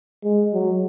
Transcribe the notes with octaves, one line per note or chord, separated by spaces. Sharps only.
G#3
F#3